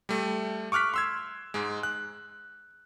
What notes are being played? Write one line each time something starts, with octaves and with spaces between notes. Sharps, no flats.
G3 A3
C#6 D6 F6 F#6 B6
C6 E6 G#6
G#2 G#3
F#6